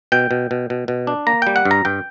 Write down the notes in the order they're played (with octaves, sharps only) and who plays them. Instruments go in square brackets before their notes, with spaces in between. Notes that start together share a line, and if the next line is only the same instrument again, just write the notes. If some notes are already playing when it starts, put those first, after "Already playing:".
[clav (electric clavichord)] B2 G5
B2
B2
B2
B2
D4
A#3 A#5
G3 G5
F#5
G2
A#5
G2 G5